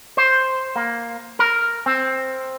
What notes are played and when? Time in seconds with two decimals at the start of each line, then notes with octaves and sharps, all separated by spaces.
0.17 C5
0.76 A#3
1.39 A#4
1.86 C4